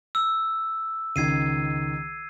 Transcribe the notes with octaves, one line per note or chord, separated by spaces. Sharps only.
E6
C#2 D#3 G#6 C7 D#7